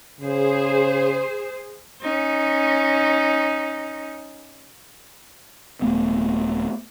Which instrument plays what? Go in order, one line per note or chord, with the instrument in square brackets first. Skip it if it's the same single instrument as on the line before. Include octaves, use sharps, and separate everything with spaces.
[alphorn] C#3 [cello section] G#4 C5
[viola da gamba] C#4 D#4
[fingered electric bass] D#1 A3 B3